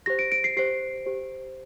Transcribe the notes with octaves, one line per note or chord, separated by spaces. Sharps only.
G4 C5 A#6
D7
D7
C7
G4 C5 C7
G4 C5